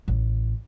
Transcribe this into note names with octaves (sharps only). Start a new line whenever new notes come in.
A1